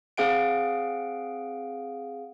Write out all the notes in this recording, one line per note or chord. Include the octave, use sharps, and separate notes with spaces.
C4 G#4 F5 F#5 D7